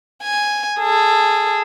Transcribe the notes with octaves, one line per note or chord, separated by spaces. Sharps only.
G#5
G#4 A4